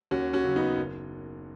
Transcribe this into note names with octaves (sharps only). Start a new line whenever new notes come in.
D#2 C#4 F#4
C#4 F#4
C#3 F#3
B3 D#4
F#1